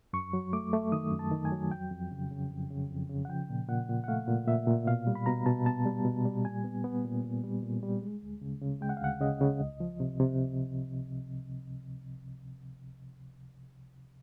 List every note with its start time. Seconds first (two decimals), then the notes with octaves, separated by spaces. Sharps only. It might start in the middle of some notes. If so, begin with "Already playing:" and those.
0.13 F#2 C#6
0.33 F#3
0.53 A3 D6
0.73 A3
0.92 D#3 D#6
1.12 F#2
1.19 A5
1.31 D#3
1.45 G#5
1.52 F#3
1.71 F2 G5
1.91 F2
2.11 C#3
2.31 C#3
2.50 F2
2.71 C#3
2.90 F2
3.09 C#3
3.25 F#5
3.29 F3 G5
3.50 A#2
3.69 A#2 F#5
3.89 A#2
4.04 F#5
4.08 A3 F5
4.28 A#2
4.48 A#2 E5
4.67 A#2
4.87 B2 F5
5.07 G3
5.15 B5
5.26 B2 A#5
5.46 B2 A5
5.66 B3 A5
5.85 G3
6.05 B2
6.25 G3
6.45 A#2 G#5
6.64 B3
6.84 B3
7.04 A#2
7.24 A#2
7.43 G3
7.63 A#2
7.83 G3
8.02 G#3
8.22 D2
8.41 C#3
8.61 C#3
8.81 G#3 G5
8.89 F#5
8.97 F5
9.02 D2 F#5
9.21 C#3 D#5
9.40 C#3
9.61 C#2
9.80 F3
10.00 C3
10.20 C3